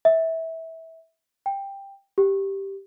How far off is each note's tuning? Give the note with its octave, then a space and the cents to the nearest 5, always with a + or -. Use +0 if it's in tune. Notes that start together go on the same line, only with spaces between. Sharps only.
E5 -20
G5 +10
G4 -5